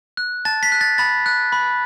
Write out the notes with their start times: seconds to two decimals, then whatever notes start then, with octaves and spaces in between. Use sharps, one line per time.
0.17 F#6
0.45 A5 A6
0.63 B6
0.72 F#6
0.81 A6
0.98 B5 A6
1.26 F#6
1.52 B5